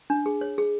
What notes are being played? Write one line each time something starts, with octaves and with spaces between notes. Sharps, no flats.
D4
G#4
C#5
G#4